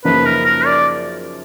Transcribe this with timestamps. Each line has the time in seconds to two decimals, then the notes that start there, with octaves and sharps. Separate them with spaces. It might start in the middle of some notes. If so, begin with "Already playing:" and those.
0.05 F#2 C#3 F3 A#3 D#4 B4
0.25 A#4
0.45 A#4
0.66 D5